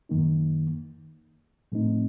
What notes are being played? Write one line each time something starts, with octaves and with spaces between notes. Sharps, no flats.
F#2 D#3 A#3 D#4
A2 F3 A3 C4 D#4